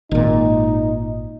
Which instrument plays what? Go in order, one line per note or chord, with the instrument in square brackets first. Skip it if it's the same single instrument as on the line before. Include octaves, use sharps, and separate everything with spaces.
[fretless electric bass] G#1 A#2 [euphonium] D#4